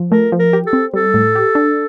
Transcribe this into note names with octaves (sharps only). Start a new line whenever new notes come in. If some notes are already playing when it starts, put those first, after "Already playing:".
Already playing: F3
A3 A#4
F3
A#4
G4
A4
C4
G3 A4
A2
G4
D4